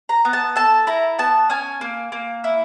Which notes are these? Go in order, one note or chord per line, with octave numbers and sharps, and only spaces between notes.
A#5
B3
A5
A4 A5
E4 A#5
B3 A5
C#4 G#5
A#3
A#3
E4